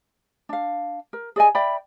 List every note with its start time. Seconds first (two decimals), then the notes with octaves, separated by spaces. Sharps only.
0.49 D4 F5
1.13 A#4
1.36 G#4 D5 D#5 G#5
1.55 D5 E5 G5 B5